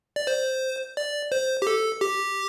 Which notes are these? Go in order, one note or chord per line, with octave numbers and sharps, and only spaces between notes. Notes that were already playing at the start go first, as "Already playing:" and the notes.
D5
C5
D5
C5
G4
A4
G4